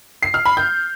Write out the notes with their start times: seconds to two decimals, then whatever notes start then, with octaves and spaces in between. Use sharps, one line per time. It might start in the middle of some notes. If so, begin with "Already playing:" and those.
0.23 C7
0.34 F6
0.45 B5
0.57 G6